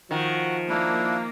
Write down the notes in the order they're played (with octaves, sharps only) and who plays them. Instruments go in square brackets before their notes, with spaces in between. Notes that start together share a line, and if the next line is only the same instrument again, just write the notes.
[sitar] D#3 [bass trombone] F3 [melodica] F#4
[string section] A#3 [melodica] D4 E4